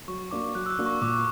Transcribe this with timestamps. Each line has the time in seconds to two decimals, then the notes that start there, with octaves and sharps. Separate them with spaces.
0.08 F#3 C#6
0.31 A#3 D4 F#4 D6
0.55 F#3 F#6
0.66 E6
0.71 F#6
0.78 A#3 D4 F#4
0.86 C#6
1.01 A#2 D6